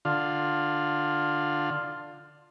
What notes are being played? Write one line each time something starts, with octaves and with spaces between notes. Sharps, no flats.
D3 F4